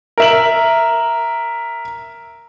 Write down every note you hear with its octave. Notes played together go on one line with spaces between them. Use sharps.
A#4 E5 F#7